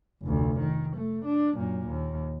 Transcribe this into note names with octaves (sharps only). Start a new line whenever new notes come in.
F1 D2
D#3
A3
D4
F#2 A#2
D#2